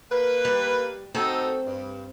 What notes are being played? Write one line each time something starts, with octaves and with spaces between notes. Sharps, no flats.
A#3 A#4 B4
G3
C4 D#4 F#4 A4
G2